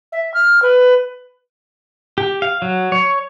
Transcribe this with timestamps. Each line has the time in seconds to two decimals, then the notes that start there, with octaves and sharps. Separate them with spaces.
0.12 E5
0.34 F6
0.62 B4
2.18 G4
2.42 F5
2.62 F#3
2.92 C#5